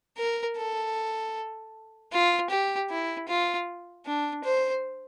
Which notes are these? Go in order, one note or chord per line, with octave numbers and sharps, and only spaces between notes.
A#4
A4
F4
G4
E4
F4
D4
C5